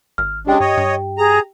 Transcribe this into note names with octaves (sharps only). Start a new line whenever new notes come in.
G#1 F6
C#3 G#3 D4 G4 G5
G2 C#5 D#5
G2
G#4 A#5